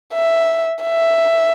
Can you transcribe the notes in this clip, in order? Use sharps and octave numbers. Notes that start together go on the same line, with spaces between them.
E5
E5